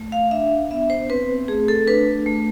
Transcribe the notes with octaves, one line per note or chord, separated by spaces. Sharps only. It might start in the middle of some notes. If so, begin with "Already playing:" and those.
Already playing: A3
F5
D4 E5
B3 E5
C5
C4 B4
A3 G#4
A4
D4 B4
A3